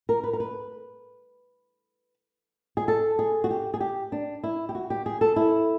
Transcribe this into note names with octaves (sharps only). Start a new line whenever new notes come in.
A#4
B4
A#4
B4
G#4
A4
G#4
F#4
G4
G#4
G4
D4
E4
G4
F#4
G4
G#4
A4
E4